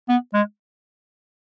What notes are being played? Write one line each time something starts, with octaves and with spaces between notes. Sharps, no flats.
B3
G#3